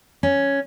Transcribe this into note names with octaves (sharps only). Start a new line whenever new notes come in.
C#4